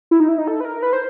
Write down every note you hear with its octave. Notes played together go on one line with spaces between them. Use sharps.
E4
D#4
E4
D#4
A4
B4
A#4
B4
C5